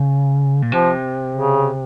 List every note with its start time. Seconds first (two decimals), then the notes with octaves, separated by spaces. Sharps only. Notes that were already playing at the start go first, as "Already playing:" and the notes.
Already playing: C#3
0.62 A#2
0.72 C3 F3
1.34 C#3